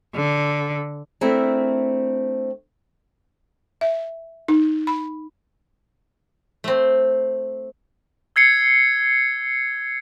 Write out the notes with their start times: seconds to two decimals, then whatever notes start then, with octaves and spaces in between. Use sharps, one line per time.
0.15 D3
1.21 A3 C4 D4 E4 A#4
3.81 E5
4.48 D#4
4.87 B5
6.64 A3 C4
8.36 E6 G#6 C7 C#7